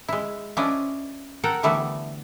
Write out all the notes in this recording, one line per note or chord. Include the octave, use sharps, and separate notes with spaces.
G#3 E4
F3 C#4 D4 E4 D5 D#5
A4 A#4 F#5 G5
D3 E3 G3 A3 B3 E4